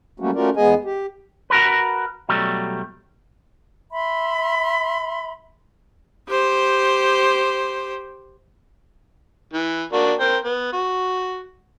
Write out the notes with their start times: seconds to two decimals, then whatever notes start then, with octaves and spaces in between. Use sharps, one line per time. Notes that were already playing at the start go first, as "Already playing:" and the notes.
0.20 F#3 G3 A3 A#3 C#4 F#4
0.35 A3 C#4 F4 F#4 A#4 D5
0.56 E2 G#3 B3 G#4 D#5 G#5
0.85 G4
1.50 F#4 A#4 B4
2.29 B2 F#3 G3 A3
3.91 E5 B5 C6
6.29 G4 C5
9.53 E3
9.93 A#3 D4 F#4
10.20 A#4 C5 G5
10.45 B3
10.73 F#4